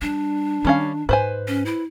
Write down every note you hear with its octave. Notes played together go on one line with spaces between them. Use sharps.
G3 D4
D#3 G3 C#4 F5
G#2 B4 C5 G#5
C#4
E4